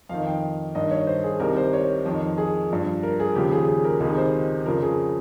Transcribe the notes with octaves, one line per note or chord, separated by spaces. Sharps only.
F2 D#3 F5
G5
G2 D#3 D#5
C#5
C5
G#4
C2 C3 D#3 A#4
C5
C#5
F2 D#3
G#4
G2 F3
A#4
G#4
D#2 C#3 F3 G4
G#4
G#4
A#4
C#2 C3 D#3 G#4
C5
F2 C#3 F3 A#4
G#4